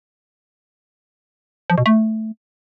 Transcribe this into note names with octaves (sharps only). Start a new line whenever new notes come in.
F3
B2
A3